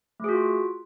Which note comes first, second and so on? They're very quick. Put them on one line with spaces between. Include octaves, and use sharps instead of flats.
A3 G#4 F#4 F4